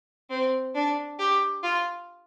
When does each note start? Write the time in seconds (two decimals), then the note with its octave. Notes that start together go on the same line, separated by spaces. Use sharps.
0.30 C4
0.74 D4
1.19 G4
1.63 F4